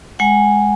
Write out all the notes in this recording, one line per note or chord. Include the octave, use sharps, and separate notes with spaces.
G#3 F#5 G#5